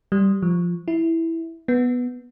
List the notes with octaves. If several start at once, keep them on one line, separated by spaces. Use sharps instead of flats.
G3
F3
E4
B3